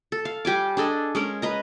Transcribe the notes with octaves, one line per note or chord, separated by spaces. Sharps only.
A4
F5
G3 G4 G#5 D6
D4 G#4 A4 D#5
G#3 C#4 A#4
B4 D#5 A#5